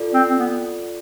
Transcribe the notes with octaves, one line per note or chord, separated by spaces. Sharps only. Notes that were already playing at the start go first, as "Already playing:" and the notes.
Already playing: F4 A4 D5
C4
C4
B3